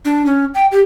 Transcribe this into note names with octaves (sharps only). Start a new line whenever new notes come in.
D4
C#4
G5
G4